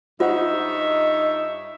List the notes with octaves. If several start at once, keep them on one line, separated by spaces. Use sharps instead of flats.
G2 D#4 F4 C5 C#5 E5 F#5